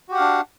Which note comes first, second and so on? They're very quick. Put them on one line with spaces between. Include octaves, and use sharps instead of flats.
F#4 G4 F#5 F5 D4